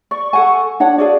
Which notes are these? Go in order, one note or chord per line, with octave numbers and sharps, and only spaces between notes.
D5 C#6
A4 F#5 G#5
D4 C#5 F#5
F#4 G#4 D5 F5